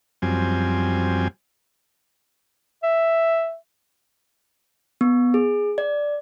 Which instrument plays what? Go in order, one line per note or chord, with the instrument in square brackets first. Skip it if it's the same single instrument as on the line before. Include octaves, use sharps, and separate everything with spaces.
[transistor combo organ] F#2 F3 G3 C4 G#5
[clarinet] E5
[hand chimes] B3
G#4
D5